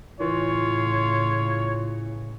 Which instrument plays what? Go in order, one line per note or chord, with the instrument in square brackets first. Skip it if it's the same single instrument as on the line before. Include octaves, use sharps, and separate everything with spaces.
[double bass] A2 C#3 [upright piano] E3 [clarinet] F4 [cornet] C#5